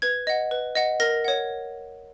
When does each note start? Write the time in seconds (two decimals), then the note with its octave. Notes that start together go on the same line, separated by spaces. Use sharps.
0.02 B4 G#6
0.27 D#5 F#5
0.51 B4
0.76 D#5 F#5
1.00 A#4 A#6
1.24 C#5 F#5